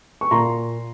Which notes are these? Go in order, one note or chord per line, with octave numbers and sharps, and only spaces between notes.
C#6
A#2 A#5 C6